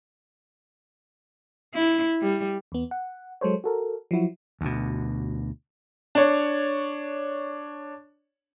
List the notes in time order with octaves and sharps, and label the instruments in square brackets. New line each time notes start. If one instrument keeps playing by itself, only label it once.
[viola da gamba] E4
G3
[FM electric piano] E2 B3
F#5
F#3 G#3 A4 C5 C#5
F#4 A4 A#4
F3 F#3 E4 F#4
[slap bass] D2 B2
[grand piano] D4 C#5